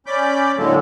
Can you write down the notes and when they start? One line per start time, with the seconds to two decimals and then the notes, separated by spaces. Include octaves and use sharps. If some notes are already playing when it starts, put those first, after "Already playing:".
0.06 C#4 D5 B5 D6 G6
0.58 A2 D3 F#3 G#3 A#3 A4